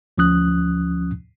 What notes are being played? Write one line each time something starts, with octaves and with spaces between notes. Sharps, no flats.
D2 F3 C#4 D#6 F#6